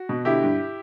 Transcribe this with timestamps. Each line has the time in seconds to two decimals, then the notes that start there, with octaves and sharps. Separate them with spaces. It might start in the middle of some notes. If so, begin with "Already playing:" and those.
Already playing: F#4
0.09 B2
0.25 D3 E4 G4
0.43 G2